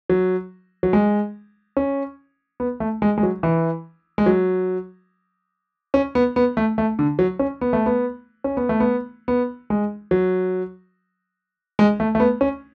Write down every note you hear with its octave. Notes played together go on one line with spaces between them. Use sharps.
F#3
F#3
G#3
C#4
B3
A3
G#3
G#3
F#3
E3
G#3
F#3
C#4
B3
B3
A3
A3
D3
F#3
C#4
B3
A3
B3
C#4
B3
A3
B3
B3
G#3
F#3
G#3
A3
A3
B3
C#4